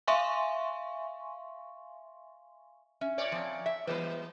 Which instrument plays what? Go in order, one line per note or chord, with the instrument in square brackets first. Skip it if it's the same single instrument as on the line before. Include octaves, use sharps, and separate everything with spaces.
[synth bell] E5 F5 G#5 C6 C#6
[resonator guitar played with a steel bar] C#4 [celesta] E5
[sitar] A#2 C#5 D5
[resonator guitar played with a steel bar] F3 C4
E5
[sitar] E3 [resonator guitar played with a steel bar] G3 G#3 B3 [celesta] B4